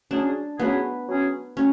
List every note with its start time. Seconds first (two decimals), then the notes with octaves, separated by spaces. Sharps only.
0.11 F#3 C#4 D4 G#4
0.59 F#3 B3 C#4 G#4
1.08 F#3 C#4 G#4
1.56 F#3 C#4